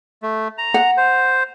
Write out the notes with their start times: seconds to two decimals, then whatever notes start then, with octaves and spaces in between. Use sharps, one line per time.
0.23 A3
0.58 A#5
0.74 F#5
0.97 C5